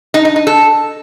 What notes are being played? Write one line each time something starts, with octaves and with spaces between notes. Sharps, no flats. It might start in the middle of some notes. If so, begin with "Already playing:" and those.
D#4
D#4
D#4
A4